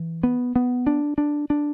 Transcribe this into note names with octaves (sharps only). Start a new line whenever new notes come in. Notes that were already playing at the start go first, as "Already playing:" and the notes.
Already playing: E3
B3
B3
D4
D4
D4